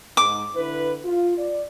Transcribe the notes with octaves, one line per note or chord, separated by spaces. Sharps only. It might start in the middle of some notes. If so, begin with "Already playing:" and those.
G#2 D#4 D6
D3 E4 B4
F4
D5